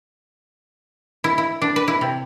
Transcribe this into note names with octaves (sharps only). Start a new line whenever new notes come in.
E4
E4
D4
B4
E4
C3